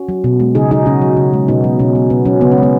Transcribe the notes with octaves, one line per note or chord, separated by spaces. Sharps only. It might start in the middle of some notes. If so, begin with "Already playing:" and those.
Already playing: C#4 F#4
F#3
B2
G#3
C#3 D#4 G#4
F#3 D#4 G#4
C#3 C#4 F#4
F#3
C#3
G#3
B2 B3 D#4
F#3
B2 C#4
F#3
B2 B3
F#3 C#4
C#3 B3
C#4
G#3
B3